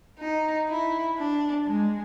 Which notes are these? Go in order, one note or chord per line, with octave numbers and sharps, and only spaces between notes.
D#4
E4
D4
G#3